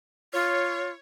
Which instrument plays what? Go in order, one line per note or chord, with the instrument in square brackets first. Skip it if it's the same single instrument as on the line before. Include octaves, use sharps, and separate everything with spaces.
[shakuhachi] F4 [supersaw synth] C#5